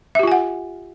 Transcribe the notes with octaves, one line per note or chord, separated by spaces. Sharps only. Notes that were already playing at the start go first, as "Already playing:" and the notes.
F4 G4 E5 F#5 G#5